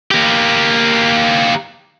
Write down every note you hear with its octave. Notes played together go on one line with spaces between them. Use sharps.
A#3 G4